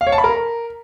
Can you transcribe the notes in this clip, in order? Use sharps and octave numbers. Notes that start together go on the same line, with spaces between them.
F5
C#5
A5
B5
A#4